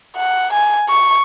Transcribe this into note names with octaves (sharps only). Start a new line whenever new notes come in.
F#5
G#5
C#6